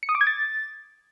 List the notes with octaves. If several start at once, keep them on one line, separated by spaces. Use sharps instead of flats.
C#7
D#6
D6
G#6
A6